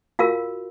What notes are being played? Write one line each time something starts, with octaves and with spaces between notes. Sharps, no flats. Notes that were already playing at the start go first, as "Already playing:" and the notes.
F4 F#4 A#4 F5